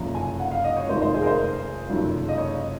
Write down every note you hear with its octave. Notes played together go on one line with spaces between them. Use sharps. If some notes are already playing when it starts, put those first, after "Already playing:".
Already playing: F#1 F2 C3 F3 A#5
G#5
F#5
F5
D#5
C#5
F1 F2 D#3 C5
C5
G#4
A#4
C5
F#1 F2 C3 D#3 F#3
D#5
C#5
D#5